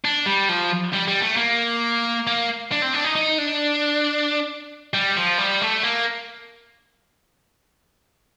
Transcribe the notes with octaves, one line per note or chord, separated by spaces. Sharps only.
D4
G3
F3
G3
G3
A3
A#3
A#3
D4
C4
D4
D#4
D#4
D4
G3
F3
G3
A3
A#3